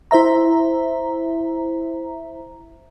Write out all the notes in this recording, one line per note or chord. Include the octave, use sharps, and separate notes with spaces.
E4 C5 E5 A#5